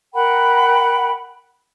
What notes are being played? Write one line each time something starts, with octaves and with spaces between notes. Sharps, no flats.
A#4 F#5 G5 B5